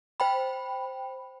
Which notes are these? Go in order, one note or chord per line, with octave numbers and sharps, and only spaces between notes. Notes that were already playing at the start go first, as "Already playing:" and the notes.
C5 G5 B5